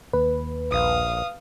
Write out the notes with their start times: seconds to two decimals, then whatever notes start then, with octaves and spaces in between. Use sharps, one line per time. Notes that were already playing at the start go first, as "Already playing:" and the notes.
0.13 D#2 B4
0.71 A#1 F5 D#6